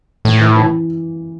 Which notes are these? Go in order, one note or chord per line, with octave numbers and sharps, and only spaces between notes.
A2 E3
E3
E3